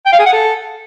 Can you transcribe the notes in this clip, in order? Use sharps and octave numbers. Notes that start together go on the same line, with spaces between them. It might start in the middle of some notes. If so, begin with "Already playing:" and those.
G5
F5
G#4
F#5
A4